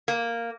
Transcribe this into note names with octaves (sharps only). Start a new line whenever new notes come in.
A#3